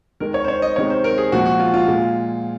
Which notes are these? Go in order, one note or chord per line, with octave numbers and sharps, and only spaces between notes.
D#3 G#3 A#4
C#5
C5
C#5
D#5
C3 D#3 G#3 C#5
C5
A#4
G#4
A#2 F3 G#3 F#4
F#4
F4
F4
A#2 G#3